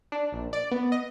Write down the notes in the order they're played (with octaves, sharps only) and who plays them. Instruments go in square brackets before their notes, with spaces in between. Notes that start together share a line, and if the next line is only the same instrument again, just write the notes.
[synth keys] D4
A#1
D5
B3
D#5